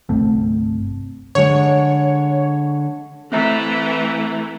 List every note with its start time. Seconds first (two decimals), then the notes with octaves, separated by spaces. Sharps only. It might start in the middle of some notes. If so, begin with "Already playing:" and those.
0.09 G1 C2 A3 C4
1.35 D3 G#3 C#5
3.32 E3 A3 C4 E5 A#5